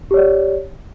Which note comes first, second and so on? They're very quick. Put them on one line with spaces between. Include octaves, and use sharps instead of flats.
G4 C#5 D5